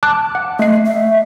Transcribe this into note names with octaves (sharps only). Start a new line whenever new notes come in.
A5 D6 F#6
F#5
A3 D#5 C7
E5